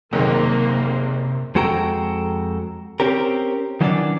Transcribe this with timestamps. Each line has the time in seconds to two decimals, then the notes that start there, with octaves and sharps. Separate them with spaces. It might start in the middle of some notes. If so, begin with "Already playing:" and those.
0.13 F#1 F#2 C3 D#3 A#3 C4
1.55 F2 G#3 F#4 A4 G5 A#5
3.00 C4 C#4 G4 A#4
3.81 D#3 E3 F#3 C#4 D4 D5